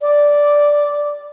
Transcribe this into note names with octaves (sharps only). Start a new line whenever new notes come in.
D5